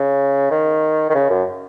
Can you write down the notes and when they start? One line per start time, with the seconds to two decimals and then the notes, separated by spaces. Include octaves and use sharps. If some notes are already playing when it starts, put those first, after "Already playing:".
Already playing: C#3
0.51 D#3
1.10 D#3
1.15 C#3
1.30 F#2